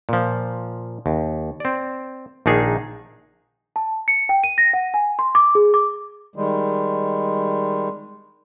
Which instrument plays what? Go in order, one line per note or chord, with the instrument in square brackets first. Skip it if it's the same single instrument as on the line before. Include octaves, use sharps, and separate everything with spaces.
[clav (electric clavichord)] A#2 F3
D#2
C4 D5
A#1 D#3 D4 D#4 G#4
[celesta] A5
C#7
G5
D#7
A#6
F#5
G#5
C6
D6
G#4
D6
[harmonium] D#3 G3 G#3